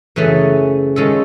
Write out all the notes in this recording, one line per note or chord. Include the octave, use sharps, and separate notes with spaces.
F#2 C#3 E3 A3 C#4
D#3 G#3 C#4 F4 A4